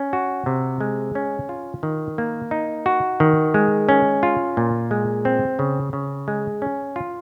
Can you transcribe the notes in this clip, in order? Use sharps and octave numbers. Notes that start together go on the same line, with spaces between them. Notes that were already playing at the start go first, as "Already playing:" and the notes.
Already playing: C#4
F#4
C3
G#3
C#4
F4
D#3
A#3
D#4
F#4
D#3
G#3
C#4
F4
A#2
G#3
C4
C#3
C#3
G#3
C#4
F4